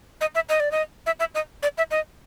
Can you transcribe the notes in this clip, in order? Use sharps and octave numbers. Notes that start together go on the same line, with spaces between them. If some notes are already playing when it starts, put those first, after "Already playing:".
D#5
E5
D#5
D5
D#5
E5
E5
D#5
D5
E5
D#5